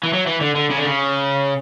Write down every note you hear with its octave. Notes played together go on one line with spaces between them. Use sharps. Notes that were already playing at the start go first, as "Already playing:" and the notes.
E3
F#3
E3
D3
D3
C#3
D3
C#3